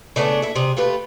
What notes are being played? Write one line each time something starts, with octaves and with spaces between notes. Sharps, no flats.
C#3 A3 B3 D4
E4 A4
C3 G#4
A3 F4 G4 B4